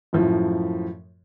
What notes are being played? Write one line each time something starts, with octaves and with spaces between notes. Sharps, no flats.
F#2 A2 F3